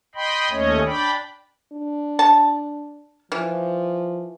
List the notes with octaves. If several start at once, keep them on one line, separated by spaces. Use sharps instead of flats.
D#5 G5 B5 C6
D#2 A3 C#4 C#5 D#5
D4 D5 G5 B5
D4
A5
E3 F3